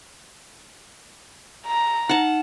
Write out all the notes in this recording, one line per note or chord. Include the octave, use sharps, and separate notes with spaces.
A#5
D#4 F#5 A5